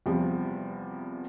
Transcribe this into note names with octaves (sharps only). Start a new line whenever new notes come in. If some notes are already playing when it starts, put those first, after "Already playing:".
E2 C3 F3 G3